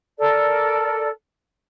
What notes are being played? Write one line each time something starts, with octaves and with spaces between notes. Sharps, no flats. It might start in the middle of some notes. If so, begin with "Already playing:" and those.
A4 A#4 D5